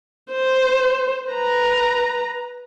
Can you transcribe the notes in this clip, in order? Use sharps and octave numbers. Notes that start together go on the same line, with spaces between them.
C5
B4 A#5